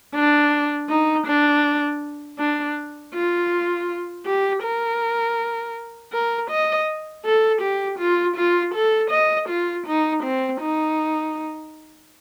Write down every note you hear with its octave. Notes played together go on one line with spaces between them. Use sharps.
D4
D#4
D4
D4
F4
G4
A#4
A#4
D#5
A4
G4
F4
F4
A4
D#5
F4
D#4
C4
D#4